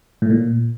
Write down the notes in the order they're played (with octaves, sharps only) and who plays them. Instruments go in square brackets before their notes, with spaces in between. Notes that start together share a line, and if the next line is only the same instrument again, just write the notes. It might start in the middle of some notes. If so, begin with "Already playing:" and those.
[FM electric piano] A2
A#2